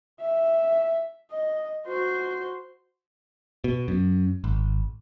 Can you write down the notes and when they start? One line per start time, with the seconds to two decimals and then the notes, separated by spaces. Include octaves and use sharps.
0.21 E5
1.32 D#5
1.86 F#4 C5
3.64 B2
3.88 F#2
4.44 G#1